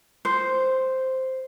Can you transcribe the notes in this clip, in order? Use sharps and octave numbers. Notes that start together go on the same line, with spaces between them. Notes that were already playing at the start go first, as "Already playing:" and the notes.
C5